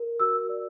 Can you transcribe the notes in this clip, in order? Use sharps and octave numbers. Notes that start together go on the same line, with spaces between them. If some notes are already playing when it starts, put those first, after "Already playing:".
Already playing: A#4
F#4 E6
D5